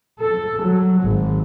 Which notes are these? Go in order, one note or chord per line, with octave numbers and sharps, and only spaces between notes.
A4
F#3
G#1